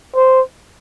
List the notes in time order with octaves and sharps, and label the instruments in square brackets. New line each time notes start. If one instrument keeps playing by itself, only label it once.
[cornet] C5